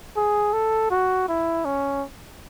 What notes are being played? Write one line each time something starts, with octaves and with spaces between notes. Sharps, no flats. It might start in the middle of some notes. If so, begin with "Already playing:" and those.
G#4
A4
F#4
E4
C#4